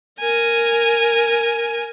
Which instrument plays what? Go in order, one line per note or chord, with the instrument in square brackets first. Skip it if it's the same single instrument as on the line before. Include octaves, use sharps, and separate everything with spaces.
[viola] A#4 G#5